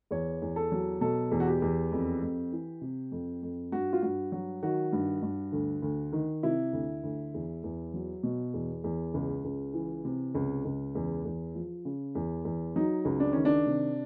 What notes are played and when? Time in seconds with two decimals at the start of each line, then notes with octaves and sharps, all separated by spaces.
0.11 E2 C#5
0.42 E2
0.56 A4
0.72 F#3
1.01 B2 A4
1.31 E2
1.40 F#4
1.47 G4
1.62 E2
1.92 F2
2.22 F2
2.52 E3
2.81 C3
3.12 F2
3.42 F2
3.72 G2 F#4
3.93 F4
4.02 G2 F#4
4.32 F#3 F#4
4.63 D#3 F#4
4.92 G2
5.22 G2
5.52 D2
5.82 D2
6.13 D#3
6.43 C3 E4
6.73 D2
7.03 D2
7.34 E2
7.64 E2
7.94 F#3
8.23 B2
8.54 E2
8.84 E2
9.14 C#2
9.44 C#2
9.74 E3
10.05 C3
10.35 C#2
10.65 C#2
10.95 E2
11.25 E2
11.55 F3
11.85 C#3
12.15 E2
12.45 E2
12.76 F#3 D#4
13.05 C#2
13.20 D4
13.33 D#3 C#4
13.45 D4
13.66 C3